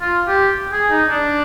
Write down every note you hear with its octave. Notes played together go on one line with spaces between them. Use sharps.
F4
G4
G#4
D#4
D4